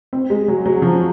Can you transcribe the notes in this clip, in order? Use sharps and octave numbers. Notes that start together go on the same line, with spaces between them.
C4
G#3
F#3
F#3
F3